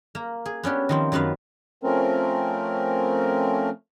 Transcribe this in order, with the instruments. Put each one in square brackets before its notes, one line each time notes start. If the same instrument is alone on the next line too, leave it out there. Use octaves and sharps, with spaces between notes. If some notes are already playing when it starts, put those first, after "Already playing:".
[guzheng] A#3
G#4
B3 C#4 D4 G4
D#3 F3 C4
F#2 D#3 B3 B4 F5
[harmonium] F3 A3 C4 C#4 A#4